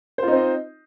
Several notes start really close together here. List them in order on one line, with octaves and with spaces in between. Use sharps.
C5 F4 D#4 C4 D#5